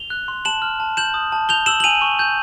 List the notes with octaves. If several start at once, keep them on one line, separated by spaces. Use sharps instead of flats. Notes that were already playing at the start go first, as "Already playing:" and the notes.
Already playing: F7 G7
F#6
C6
A5 E7 F#7
F6
A5
G6 E7 F#7
D#6
A5
G6 F7 G7
E6 E7 F#7
F#7
G#5 D#7 F7
C#6
G6